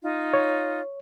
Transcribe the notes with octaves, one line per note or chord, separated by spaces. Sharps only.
D#4 F4
C#5